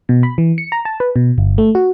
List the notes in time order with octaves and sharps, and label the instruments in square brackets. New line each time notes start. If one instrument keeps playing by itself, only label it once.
[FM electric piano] B2
B5
E3
C#7
A#5
A5
B4
B2
G1
A3
F#4